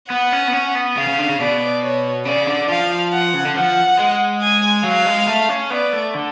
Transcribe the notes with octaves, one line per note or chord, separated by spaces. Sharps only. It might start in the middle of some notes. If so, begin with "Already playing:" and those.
B3 F#5
C#4
B3
C#4
B3
C#3 F5
C#3
D3
C#3
B2 D5
C#5
C#3 D5
D3
F3 F5
F#5
C#3
D3
F3 F#5
G#3
G#5
F#3 F5
G#3
A3
C#4
B3 D5
A3
D3